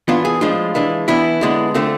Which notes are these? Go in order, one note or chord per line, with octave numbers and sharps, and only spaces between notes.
E3 B3 D4 F4
G#4
A2 F3 G#3 D4 F4
E3 G#3 D4
E3 B3 D4 E4
D3 G#3 B3 D4
D3 A3 C4 F4